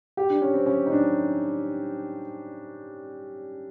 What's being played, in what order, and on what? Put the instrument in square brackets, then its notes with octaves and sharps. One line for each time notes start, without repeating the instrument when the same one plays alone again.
[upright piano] G4
D4
C#4
C4
C#4
D#4
D4